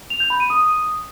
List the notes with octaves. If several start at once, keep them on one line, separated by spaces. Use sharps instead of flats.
F7
G6
B5
D#7
D#6